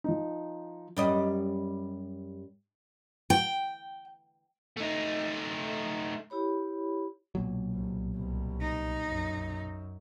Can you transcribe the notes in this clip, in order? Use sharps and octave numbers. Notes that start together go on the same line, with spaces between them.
F3 D#4
F#2 G3 D#5
G5
A3 D#4
E4 G4 C#5 B5
B1 A#2 F#3
C2 B2
C2 B2
D#4
F#2